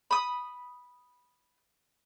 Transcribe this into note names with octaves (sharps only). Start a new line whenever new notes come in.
B5 D#6